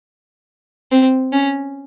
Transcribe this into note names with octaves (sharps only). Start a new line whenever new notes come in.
C4
C#4